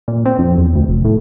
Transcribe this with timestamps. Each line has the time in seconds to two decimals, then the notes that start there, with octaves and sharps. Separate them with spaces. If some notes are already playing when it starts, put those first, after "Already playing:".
0.08 A#2
0.26 C4
0.39 F2
0.58 E2
0.75 D2
0.89 F1
1.05 A2